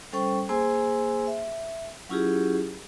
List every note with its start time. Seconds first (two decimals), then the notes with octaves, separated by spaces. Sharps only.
0.13 G3 C#4 A4 C5 G5 C#6
0.49 A#3 G#4 C5 G#5 C6 E6
1.27 E5
2.09 F#3 C#4 E4 F4 G4 G#4